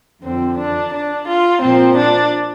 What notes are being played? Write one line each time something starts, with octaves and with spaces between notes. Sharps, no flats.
F2 D3 F3 C4
D4
D4
F4
A#2 F3 C4
D4